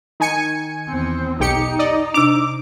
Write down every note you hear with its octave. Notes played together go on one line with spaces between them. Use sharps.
D#3 G#5 C#7
E2 C4
B1 D#4 G4 C#7
D5 D#5
C3 D4 D6